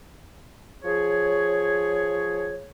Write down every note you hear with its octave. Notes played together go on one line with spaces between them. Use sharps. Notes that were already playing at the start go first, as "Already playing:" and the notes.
F3 G#4 C#5